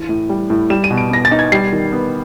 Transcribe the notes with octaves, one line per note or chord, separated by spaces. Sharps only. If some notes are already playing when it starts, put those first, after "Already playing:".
Already playing: E3 D#7
A2
G3
A2
G3 E7
D#7
B2
D7
B3 A#6
A6
D#4
G#6
G3 C7
D#3
B3